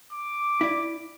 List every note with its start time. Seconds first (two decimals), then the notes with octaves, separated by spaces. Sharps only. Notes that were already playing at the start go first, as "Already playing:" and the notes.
0.12 D6
0.61 E4 D5